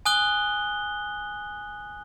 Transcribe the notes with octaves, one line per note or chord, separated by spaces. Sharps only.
G#5 D#6 F#6 G7